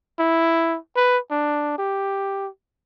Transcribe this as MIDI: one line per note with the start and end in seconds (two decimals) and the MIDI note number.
0.19 0.78 64
0.96 1.18 71
1.31 1.77 62
1.78 2.48 67